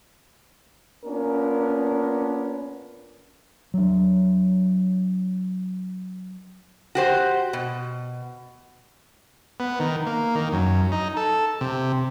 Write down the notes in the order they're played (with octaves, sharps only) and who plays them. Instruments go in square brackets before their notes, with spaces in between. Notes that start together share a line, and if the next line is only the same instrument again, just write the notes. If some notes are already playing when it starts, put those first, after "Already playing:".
[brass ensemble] A#3 B3 C#4 D4 F4 A#4
[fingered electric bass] F#3 D4
[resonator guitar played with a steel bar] F#4 G4 C5
B2
[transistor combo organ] B3
D#3
A#3
D#3
F#2
D#4
A4
C3